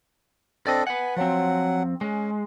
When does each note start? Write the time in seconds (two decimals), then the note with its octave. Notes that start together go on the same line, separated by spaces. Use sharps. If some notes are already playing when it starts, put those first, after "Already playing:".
0.67 C4 D4 A4 D5 D#5
0.87 B4 F#5 G#5
1.17 F3 F#3 C4 F#5
2.01 G#3 C#4